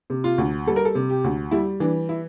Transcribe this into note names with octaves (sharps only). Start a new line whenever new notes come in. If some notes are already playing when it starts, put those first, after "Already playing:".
C3
F4
D2
G3 A4
A#4
A4
C3
G4
D2
G3 E4
E3 D4
E4